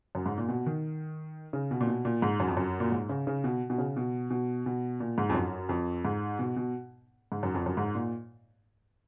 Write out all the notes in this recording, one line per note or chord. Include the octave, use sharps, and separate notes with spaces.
F#2
G#2
A#2
B2
D#3
C#3
B2
A#2
B2
A#2
G#2
F#2
F2
F#2
A#2
G#2
C#3
C#3
B2
B2
C#3
B2
B2
B2
A#2
G#2
F2
F#2
F2
G#2
B2
B2
G#2
F#2
F2
F#2
G#2
A#2